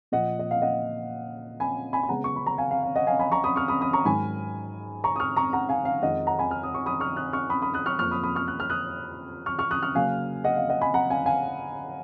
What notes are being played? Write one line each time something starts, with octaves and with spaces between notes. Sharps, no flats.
A#2 F3 A#3 D#5 F#5
D#5
F5
D#5 F#5
G#5 B5
G#5 B5
B5
C#3 G#3 B3 F#5 A#5
C#6
B5
A#5
F5 G#5
F5
F5
D#5 F#5
F5 G#5
G#5 B5
A#5 C#6
B5 D#6
C#6 F6
B5 D#6
B5 D#6
A#5 C#6
G#2 D#3 F#3 G#5 B5
A#5 C#6
D#6
C#6 F6
A#5 C#6
F#5 A#5
F5 G#5
F5
F2 D#3 G#3 D#5 F#5
F#5 A#5
G#5 B5
F6
D#6
C#6
B5 D#6
C#6 F6
D#6 F#6
C#6 F6
B5 D#6
B5 D#6
D#6 F#6
C#6 F6
F2 F3 A#3 C#6 F6
B5 D#6
B5 D#6
C#6 F6
F#6
F6
D#6 F#6
C#6 F6
C#6 F6
D#6 F#6
C#6 F6
C#3 F#3 A#3 F5 G#5
D#5 F#5
F5
D#5 F#5
G#5 B5
F#5 A#5
F5 G#5
F5 G#5